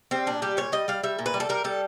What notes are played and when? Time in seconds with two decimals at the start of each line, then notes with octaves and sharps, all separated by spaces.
0.11 G3 C4
0.26 A#2 D4
0.42 G3 G4
0.57 A#2 C#5
0.72 G3 D#5
0.88 G3 F5
1.03 G3 E5
1.19 A#2
1.26 B4
1.34 G3
1.40 A4
1.49 G3 A#4
1.64 G3 A4